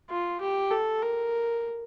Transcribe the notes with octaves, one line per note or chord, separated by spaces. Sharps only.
F4
G4
A4
A#4